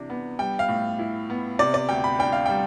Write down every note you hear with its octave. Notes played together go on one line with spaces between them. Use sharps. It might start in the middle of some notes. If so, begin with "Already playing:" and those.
Already playing: C3 E3 D4
B3
G3 G5
F5
A2
E4
B3
C3 D5
D5
D2 G5
B5
D4 G5
F5
G3 G5